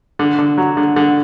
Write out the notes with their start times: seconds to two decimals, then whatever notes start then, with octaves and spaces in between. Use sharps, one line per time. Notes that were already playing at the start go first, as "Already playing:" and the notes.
0.19 D3
0.38 D3
0.58 F#3
0.77 D3
0.96 D3